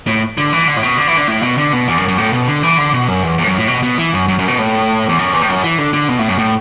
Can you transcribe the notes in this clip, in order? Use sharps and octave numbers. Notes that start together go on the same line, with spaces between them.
A2
D3
E3
D3
A2
B2
D3
E3
D3
A2
B2
D3
B2
E2
F#2
F#2
A2
B2
D3
E3
D3
B2
F#2
E2
E2
A2
F#2
A2
B2
B2
E3
F#2
F#2
F#2
B2
A2
E2
F#2
E2
A2
F#2
E3
D3
D3
B2
A2
F#2
A2